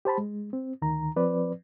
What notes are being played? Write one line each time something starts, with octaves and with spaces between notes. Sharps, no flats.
G4 C5 A5 B5
G#3
C4
D2 D#3 A#5
F3 C4 B4 D5